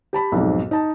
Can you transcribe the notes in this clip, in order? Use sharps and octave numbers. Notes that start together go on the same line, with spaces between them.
G4 A5 B5
B1 F2 G#2
D#4 A5